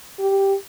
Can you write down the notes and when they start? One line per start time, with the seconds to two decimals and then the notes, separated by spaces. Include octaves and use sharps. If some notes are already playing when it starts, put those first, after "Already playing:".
0.19 G4